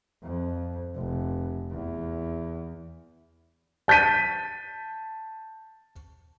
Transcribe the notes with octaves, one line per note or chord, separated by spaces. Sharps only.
F2
F1
E2
A5 G6 A6 B6 D#7